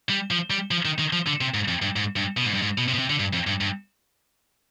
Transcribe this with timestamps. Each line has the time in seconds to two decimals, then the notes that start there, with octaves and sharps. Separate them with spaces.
0.09 G3
0.31 F3
0.50 G3
0.71 F3
0.85 D#3
0.99 D#3
1.13 F3
1.27 D3
1.41 C3
1.54 G#2
1.68 F2
1.82 G2
1.96 G#2
2.16 G2
2.37 B2
2.46 G#2
2.54 G2
2.62 G#2
2.78 B2
2.88 C3
2.94 B2
2.99 C3
3.10 D3
3.19 G2
3.33 F2
3.47 G2
3.61 G2